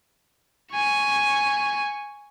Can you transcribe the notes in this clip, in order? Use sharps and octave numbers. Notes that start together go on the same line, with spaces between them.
G#5 C#6